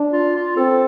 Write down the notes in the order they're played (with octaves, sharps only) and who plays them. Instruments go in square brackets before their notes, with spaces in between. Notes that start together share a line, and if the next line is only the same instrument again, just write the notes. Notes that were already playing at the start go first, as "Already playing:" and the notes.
Already playing: [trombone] D4
[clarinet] F4
F4
[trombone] C4 [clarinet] A4